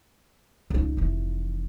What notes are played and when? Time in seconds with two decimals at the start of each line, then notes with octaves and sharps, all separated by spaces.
0.70 C#2 D#4
0.97 F1 E3